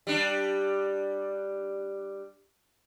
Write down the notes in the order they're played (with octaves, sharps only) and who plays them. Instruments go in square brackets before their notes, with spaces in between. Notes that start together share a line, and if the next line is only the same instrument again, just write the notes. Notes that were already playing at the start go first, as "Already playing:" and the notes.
[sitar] G3 D4